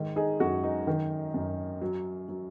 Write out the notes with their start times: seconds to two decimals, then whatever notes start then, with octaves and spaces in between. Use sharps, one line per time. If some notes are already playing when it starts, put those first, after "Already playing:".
Already playing: G#2 D#3
0.16 D#4 G#4
0.40 F#2 F#4
0.63 D#4
0.87 D#3
1.34 F#2
1.81 F#3
2.29 F#3